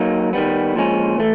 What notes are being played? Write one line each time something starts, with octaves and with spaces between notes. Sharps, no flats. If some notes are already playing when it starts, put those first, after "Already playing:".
Already playing: F#3 A#3 D#4
D#3 G3 B3
A#2 F3 G#3 C#4
E3 A3